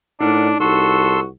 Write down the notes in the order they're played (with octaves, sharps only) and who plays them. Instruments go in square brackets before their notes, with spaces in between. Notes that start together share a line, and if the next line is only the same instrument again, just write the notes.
[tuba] A2 [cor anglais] D4 [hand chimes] D#4 [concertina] A#4 D5 F#5
[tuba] C2 [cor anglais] F#4 [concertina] A4 C6 E6